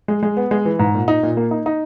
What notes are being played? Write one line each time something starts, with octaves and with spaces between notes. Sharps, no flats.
G#3
G#3
B3
G#3
E3
G#2
A#2
D#4
A#2
A#3
D#4
D#4